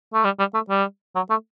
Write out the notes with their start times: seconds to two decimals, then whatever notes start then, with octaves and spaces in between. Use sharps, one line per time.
0.14 A3
0.24 G3
0.39 G3
0.54 A3
0.70 G3
1.15 F#3
1.30 A3